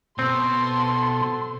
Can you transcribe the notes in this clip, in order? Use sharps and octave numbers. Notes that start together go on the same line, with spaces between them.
B2 C4 A4 C6